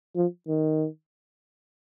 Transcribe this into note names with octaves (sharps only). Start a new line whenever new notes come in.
F3
D#3